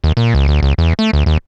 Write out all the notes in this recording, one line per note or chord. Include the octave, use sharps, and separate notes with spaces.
D#2
A#2
C#2
D2
C#2
E2
A3
D2
D#2